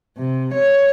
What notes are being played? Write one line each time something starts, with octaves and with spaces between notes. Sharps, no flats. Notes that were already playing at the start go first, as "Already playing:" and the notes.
C3
C#5